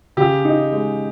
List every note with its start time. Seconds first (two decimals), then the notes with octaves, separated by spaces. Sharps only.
0.17 C#3 G4
0.45 D#4
0.73 G#3